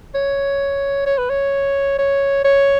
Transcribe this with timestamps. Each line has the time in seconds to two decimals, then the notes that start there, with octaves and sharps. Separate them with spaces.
0.15 C#5
1.06 C#5
1.18 B4
1.30 C#5
1.98 C#5
2.45 C#5